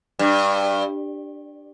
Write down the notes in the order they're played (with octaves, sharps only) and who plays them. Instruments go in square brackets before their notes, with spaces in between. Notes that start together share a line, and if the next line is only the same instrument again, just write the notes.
[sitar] G2